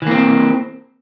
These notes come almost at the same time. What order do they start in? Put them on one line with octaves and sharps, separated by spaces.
E3 A#3 C4